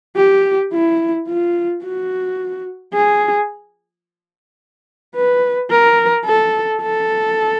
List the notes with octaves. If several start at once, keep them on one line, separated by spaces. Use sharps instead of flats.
G4
E4
F4
F#4
G#4
B4
A#4
A4
A4